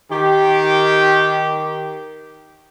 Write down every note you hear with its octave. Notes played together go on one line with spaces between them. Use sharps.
D#3 G4